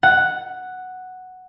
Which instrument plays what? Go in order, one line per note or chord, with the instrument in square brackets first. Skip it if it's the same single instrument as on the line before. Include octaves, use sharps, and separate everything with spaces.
[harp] F#5